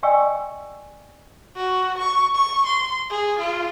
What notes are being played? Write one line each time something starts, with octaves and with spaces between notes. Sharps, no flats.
D5 D#5 G5 G#5 C#6 E6
F#4
C#6
C#6
C6
G#4
F4